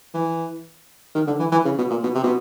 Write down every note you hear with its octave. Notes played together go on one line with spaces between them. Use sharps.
E3
D#3
D3
E3
E3
C#3
B2
A#2
B2
C3
B2